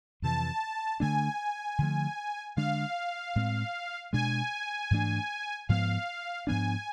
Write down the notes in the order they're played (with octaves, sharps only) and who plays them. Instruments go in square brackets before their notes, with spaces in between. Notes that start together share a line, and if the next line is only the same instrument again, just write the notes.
[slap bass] F2 C3 E3 [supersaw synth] A5
[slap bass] D3 A3 D4 [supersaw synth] G#5
[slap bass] D3 F3 A3
[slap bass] D3 G#3 D4 [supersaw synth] F5
[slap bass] A2 G#3 C4
[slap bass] B2 G#3 D4 [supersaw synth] G#5
[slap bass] G#2 E3 A3 D4
[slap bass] G#2 F3 B3 [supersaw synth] F5
[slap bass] G#2 F3 B3 D4 [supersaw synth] G#5